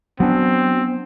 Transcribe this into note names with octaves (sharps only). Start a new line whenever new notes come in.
F#3 B3 C4 D4